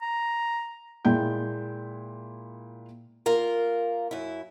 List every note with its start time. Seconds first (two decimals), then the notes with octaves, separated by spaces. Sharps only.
0.02 A#5
1.05 A#2 G#3 E4 G5 G6
3.26 A#3 F4 A#4
4.11 F#2 E4